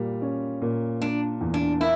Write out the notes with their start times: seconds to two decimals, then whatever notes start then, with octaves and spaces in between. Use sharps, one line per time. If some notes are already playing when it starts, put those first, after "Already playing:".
Already playing: A#2 G3
0.22 C#4
0.62 A#2
1.01 A#3 D4
1.41 E2
1.54 D4
1.80 A#3 E4